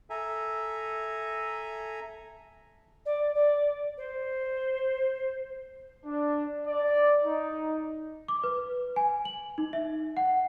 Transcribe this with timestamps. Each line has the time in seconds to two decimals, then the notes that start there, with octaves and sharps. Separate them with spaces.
0.10 A4 E5 G#5 A#5
3.06 D5
3.35 D5
3.97 C5
6.05 D4
6.67 D5
7.24 D#4
8.28 D6
8.44 B4
8.96 G#5
9.25 F#7
9.58 D#4
9.73 E5
10.17 F#5